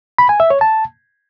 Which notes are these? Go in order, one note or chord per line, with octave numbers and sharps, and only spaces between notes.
B5
G#5
E5
C#5
A5